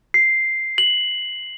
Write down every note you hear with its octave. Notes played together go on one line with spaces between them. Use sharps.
C7
F#7